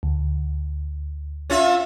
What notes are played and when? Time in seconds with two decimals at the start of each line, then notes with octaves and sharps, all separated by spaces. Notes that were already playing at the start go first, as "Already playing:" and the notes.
0.03 D2
1.50 C#4 F4 E5